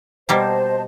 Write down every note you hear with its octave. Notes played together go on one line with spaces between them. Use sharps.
B2 G3 A#3 C5 D#5 A5